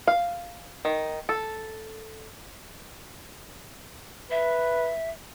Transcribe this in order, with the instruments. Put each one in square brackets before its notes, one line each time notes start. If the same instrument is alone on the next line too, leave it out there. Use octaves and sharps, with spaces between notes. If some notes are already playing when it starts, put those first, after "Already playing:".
[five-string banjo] F5
D#3
A4
[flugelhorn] B4 [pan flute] E5